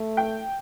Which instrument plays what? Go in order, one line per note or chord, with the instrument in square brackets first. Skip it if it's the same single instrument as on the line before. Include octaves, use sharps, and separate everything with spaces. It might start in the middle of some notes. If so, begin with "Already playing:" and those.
Already playing: [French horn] A3
[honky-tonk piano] G5